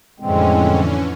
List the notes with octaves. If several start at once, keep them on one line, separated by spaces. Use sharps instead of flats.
F2 A2 D3 E3 G#3 C4 C#4